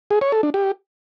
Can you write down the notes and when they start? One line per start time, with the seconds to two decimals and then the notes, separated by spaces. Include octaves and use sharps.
0.11 G#4
0.21 C#5
0.32 A4
0.43 D4
0.54 G4